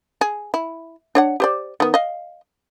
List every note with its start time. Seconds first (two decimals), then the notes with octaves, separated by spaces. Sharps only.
0.21 G#4
0.54 E4
1.15 D4 C#5 F#5
1.40 G4 C5 D5
1.80 D#3 B3
1.94 D#5 F5